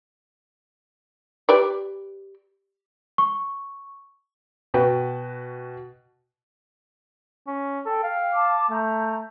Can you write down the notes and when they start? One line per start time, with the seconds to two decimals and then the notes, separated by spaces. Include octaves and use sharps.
1.49 G4 B4 D5
3.18 C#6
4.74 B2 F#4 B4 G5
7.47 C#4
7.86 A4 G5
8.03 F5
8.33 A5 D6
8.70 A3 A#5 G6